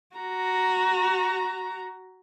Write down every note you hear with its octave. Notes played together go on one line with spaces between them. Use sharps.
F#4 A#5